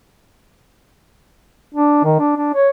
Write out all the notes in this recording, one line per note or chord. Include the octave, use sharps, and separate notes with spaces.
D4
D#3
D4
D4
C#5